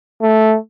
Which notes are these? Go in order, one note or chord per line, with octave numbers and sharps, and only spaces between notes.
A3